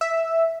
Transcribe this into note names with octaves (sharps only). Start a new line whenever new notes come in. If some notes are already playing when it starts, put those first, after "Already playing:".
E5